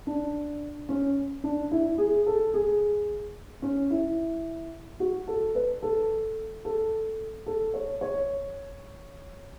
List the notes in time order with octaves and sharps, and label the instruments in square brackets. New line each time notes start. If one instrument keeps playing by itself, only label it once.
[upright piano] D4
C#4
D4
E4
G#4
A4
G#4
C#4
E4
F#4
A4
B4
A4
A4
A4
C#5
C#5